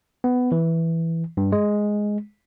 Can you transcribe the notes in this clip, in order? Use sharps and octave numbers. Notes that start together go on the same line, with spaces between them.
B3
E3
G2
G#3